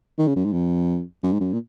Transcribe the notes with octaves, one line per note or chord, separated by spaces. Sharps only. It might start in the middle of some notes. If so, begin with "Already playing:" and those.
D#3
C#3
F#2
G#2
F2
F#2
G#2
F#2
A#2